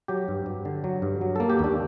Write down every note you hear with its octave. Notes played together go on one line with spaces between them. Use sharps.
F#3 G4
G2
G2
D3
F#3
G2
F#3
A#3 A4
G4
D#2 D4